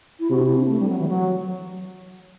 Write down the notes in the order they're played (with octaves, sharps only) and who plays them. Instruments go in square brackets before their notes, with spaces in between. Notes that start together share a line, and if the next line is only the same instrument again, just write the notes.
[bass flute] E4
[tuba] C3 [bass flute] F#4
[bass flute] D4
E4
D4
B3
A3
G3
F#3
E3
F#3